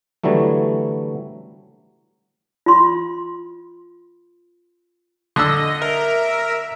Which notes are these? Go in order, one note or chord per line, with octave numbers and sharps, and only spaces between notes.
D3 E3 F#3 G3 A3
F4 C6
D3 D#5 E6
A#4 E5